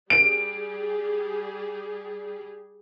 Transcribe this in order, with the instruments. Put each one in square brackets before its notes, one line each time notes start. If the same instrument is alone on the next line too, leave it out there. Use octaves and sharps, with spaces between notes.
[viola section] G3 G4 G#4 [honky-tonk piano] D7